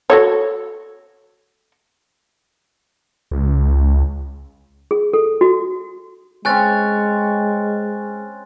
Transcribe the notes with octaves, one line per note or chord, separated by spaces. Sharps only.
F#4 A4 C#5
C#2
G#4
A4
F#4
G#3 C4 C#4 C#5 G#5 F#6 A6